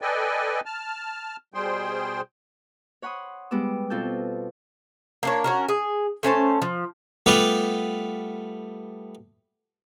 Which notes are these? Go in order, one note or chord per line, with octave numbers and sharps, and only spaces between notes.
A4 B4 D5 D#5 G5 G#5
A5 F6
B2 G3 G#4 C5 G5 C6
C#5 F#5 B5 C6 D#6
G3 G#3 B3 D6 E6
B2 C4 F4 A4 E6 G6
A#3 D4 C#5
C#4 F#4 A#4
G#4
A3 C#4 C5 A5
F3
G3 A3 B3 F4 G4 B4